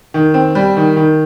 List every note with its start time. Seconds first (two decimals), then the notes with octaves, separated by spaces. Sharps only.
0.14 D#3
0.34 C4
0.55 G3
0.77 D#3
0.96 D#3